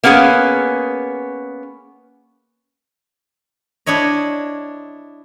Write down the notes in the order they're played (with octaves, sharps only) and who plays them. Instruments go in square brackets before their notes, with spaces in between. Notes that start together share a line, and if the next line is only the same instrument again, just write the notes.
[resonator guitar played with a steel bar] A#3 B3 C#4 G#4
[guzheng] D4 E4 C#5 D#5